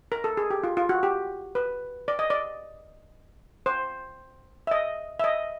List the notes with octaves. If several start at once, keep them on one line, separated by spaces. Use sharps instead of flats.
A#4
A4
G#4
G4
F4
F4
F#4
G4
B4
D5
D#5
D5
C5
E5
D#5
E5
D#5